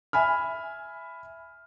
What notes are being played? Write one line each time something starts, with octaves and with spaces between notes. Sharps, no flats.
E5 G#5 B5 F6